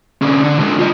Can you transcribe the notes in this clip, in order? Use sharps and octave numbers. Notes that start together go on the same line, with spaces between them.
D3 C#4
D3
D3 G#3
F4 D#5